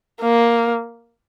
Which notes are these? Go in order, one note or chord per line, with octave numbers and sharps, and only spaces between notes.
A#3